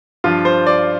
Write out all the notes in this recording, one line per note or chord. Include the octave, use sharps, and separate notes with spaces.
G2 F3 F4
C5
D5